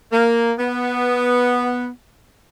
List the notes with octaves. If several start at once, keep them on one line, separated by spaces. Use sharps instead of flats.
A#3
B3